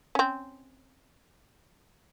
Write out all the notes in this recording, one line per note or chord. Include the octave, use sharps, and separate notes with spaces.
C4 C#4